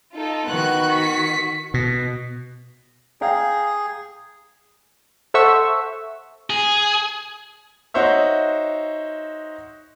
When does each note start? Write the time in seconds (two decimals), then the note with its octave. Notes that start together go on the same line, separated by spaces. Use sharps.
0.16 D#4 F4 A4
0.48 D#3 B3 F#4 F#6
0.93 B6 C#7
1.74 B2
3.21 G#4 F5 G5 A#5
5.34 A4 C5 E5 F#5 C#6 E6
6.50 G#4
7.94 D#4 F#4 C5 C#5 E5